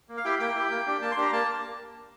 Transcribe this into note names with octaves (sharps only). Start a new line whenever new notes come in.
A#3
F5
E4 G4 G5
A#3 G5
E4 G4
A#3
D4 G4
A#3 A5
C6
D4 G4 A#5
A#3 A5